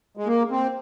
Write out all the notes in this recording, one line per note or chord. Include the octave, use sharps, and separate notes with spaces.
G#3
A#3
C4